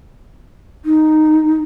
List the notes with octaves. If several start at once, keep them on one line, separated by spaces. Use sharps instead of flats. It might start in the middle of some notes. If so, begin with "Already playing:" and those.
D#4